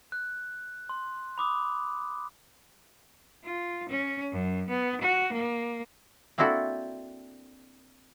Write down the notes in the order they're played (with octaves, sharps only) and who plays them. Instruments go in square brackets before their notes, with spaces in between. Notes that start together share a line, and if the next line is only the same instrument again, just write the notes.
[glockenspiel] F#6
C6
B5 D6 D#6
[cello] F4
C#4
F#2
B3
F#4
A#3
[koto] A#3 C4 D4 E4 F#4 A4